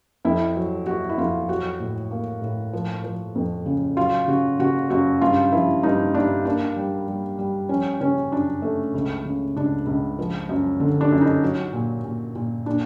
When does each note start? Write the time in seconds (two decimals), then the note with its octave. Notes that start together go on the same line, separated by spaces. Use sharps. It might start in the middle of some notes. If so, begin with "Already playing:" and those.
0.25 F2 E4
0.56 F#3
0.86 F#3 F#4
1.09 E4
1.18 F2 F4
1.48 F#3 F#4
1.80 A2
2.11 A#3
2.42 A2
2.73 F3
3.04 F3
3.35 F2
3.66 C#3
3.97 F#3 F4
4.28 C#3 F#4
4.59 C#3 F#4
4.90 F#2 F#4
5.21 G2 F4
5.52 F3 E4
5.83 G2 D#4
6.14 G2 D4
6.45 A#3 D4
6.76 G3
7.08 G3
7.39 G3
7.69 F3 C#4
8.01 C#3 C#4
8.32 F#2 D4
8.62 A3
8.94 C#2
9.25 C#3
9.56 C#2 D4
9.86 C#2
10.19 F3
10.49 F#2
10.80 D3
11.01 D4
11.11 F#2
11.21 D#4
11.43 F#3
11.73 A#2
12.05 A#2
12.35 A#2
12.66 A#2 D4